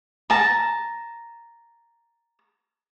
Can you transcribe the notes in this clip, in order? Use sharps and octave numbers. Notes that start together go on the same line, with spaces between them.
A5 A#5